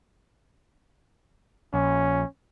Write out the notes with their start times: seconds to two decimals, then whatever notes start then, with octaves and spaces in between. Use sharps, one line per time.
1.74 A#1 C#4